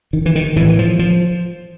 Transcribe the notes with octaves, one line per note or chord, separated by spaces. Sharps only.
D#3
E3
D#3
A2 E3
F3
F3